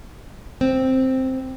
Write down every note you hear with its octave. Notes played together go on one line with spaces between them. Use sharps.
C4